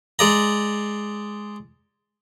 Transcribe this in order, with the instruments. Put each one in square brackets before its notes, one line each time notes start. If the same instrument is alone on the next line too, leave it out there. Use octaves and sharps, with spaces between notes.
[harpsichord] G#3 D5 A#5